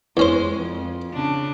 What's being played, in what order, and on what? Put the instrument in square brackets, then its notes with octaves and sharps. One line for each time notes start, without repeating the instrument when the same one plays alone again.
[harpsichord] E2 C#4 C5 [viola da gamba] G#3
[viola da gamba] F2
C#3 D4